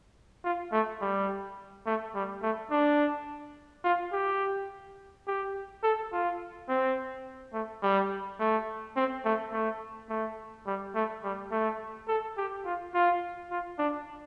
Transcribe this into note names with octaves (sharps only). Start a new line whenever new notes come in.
F4
A3
G3
A3
G3
A3
D4
F4
G4
G4
A4
F4
C4
A3
G3
A3
C4
A3
A3
A3
G3
A3
G3
A3
A4
G4
F4
F4
F4
D4